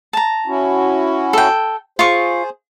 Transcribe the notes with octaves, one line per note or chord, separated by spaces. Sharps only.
A5 A#5
C#4 E4 F#4
A4 G5
F4 G#4 C5 C#6